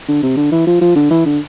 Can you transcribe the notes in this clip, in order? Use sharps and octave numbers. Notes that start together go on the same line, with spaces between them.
D3
C3
D3
E3
F3
F3
D3
E3
D3